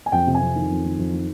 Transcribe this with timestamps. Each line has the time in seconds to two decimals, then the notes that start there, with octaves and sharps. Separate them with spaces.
0.06 G#5
0.12 F2 G5
0.27 C3
0.35 G#5
0.41 F2
0.56 D#3
0.71 F2
0.85 D#3
0.99 F2
1.13 D#3